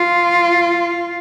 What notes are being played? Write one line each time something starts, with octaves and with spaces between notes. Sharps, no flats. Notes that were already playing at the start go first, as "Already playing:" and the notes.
Already playing: F4